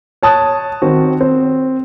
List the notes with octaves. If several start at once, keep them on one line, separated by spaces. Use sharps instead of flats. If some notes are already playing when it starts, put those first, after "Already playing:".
C#5 A5 D#6 F#6
D#3 C4 F#4
C4